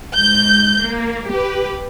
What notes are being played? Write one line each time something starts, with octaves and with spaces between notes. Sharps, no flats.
G#2 G6
A#3
G4 B4